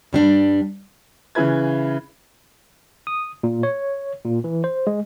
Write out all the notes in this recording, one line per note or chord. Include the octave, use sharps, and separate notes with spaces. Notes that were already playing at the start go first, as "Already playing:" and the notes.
G2 G3 D4
C#3 E3 B4 G#6
D#6
A#2
C#5
A#2
E3
C5
G#3